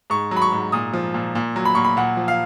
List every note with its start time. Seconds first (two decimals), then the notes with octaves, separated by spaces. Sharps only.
0.10 G#2 C#6
0.31 F#3
0.37 B5
0.42 C#6
0.52 G#2
0.72 A#2 D#6
0.93 F3
1.14 A#2
1.35 A#2
1.56 F#3
1.65 B5
1.75 A#2 C#6
1.84 B5
1.97 A#2 F#5
2.17 F3
2.28 F5